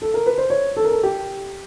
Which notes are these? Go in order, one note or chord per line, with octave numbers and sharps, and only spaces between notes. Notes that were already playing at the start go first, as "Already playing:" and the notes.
A4
A#4
B4
C5
C#5
A4
A#4
A4
G4